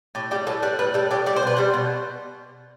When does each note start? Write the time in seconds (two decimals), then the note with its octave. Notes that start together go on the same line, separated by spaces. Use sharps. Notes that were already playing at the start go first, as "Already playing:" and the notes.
0.15 A2 G4
0.31 G3 G4
0.47 A2 A4
0.62 G3 B4
0.79 A2 B4
0.94 G3 A4
1.11 A2 G4
1.26 G3 D5
1.36 C5
1.42 B2 B4
1.57 G3 C5
1.74 B2